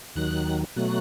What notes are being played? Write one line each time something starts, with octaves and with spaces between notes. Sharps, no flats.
D#2 D#3 F#3 F#6
B2 F#3 A3 F#6